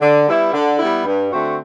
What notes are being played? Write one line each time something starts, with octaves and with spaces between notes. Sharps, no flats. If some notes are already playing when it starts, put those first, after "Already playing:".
D3
G3 B3 E4
D3
G3 B3 E4
G2
D3 A3 C4 F#4